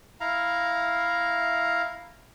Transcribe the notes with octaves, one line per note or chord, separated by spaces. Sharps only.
E4 F5 A#5